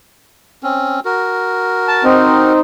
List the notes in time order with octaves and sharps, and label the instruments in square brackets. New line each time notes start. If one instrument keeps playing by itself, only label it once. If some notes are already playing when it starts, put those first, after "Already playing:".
[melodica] C4 C#4
F#4 A#4
[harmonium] A5
C4 D#4